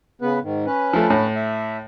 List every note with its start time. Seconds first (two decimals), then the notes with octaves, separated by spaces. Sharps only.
0.22 C#3 B3 B4
0.43 G#2 D#3
0.66 C#4 B4
0.93 F3 A3
1.10 A2
1.35 E5